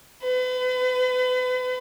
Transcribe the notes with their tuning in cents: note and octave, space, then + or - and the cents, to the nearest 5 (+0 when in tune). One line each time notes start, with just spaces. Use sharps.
B4 +40